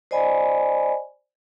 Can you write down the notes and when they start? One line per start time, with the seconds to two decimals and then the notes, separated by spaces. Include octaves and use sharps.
0.11 C5 D5 D#5 G#5 B5